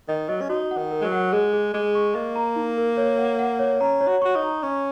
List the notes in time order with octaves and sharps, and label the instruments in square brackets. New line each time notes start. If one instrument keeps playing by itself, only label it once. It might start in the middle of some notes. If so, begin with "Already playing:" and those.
[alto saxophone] D#3 [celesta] D#5
[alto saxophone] F#3 [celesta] D#5
[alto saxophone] C#4
[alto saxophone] D#4 [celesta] F#4
[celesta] F#5
[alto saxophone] D#3
[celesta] A#4
[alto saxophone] G#3
F#3
[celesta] F#5
[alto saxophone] G#3 [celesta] G#4
[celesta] G#4
[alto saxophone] G#3 [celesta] G#4
[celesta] C#6
[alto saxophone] A#3 [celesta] D#5
[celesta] A#5
D#4
A#4
C#5
F#5
F#5
C#5
[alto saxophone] C#4 [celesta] A#5
[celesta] C#5
[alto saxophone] F#4
[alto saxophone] F#4 [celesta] C#6
[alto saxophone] D#4
[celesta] A#5
[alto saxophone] C#4 [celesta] C#6